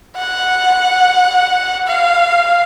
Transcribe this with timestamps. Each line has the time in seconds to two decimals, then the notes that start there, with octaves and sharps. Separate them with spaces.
0.18 F#5
1.87 F5